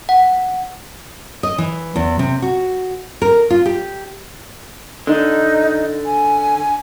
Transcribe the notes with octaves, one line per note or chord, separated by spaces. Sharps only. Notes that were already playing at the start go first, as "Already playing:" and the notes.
F#5
D#5
E3
E2
C3
F#4
A#4
F4
G4
D3 D#4
G#5